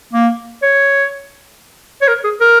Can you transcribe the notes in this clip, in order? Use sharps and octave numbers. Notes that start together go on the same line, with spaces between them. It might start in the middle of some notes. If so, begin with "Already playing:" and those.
A#3
C#5
C#5
A#4
G#4
A#4